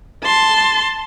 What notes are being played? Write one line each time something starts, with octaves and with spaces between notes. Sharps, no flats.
A5 C6